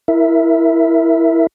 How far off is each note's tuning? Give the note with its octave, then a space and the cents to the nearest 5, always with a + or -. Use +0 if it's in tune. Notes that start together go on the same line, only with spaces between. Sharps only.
E4 +0 A#4 +0 E5 +0